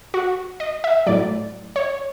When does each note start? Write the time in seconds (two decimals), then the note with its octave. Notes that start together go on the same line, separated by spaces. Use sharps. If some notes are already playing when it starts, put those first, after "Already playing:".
0.14 F#4
0.60 D#5
0.84 E5
1.07 A2 F#3 D5
1.76 C#5